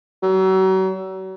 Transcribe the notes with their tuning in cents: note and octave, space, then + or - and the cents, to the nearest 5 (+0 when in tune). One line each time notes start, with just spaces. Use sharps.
F#3 +40